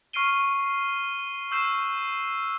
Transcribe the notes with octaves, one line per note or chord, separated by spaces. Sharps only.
C#6 F6 C7 D7 D#7 G7
C#6 E6 G6 C7 E7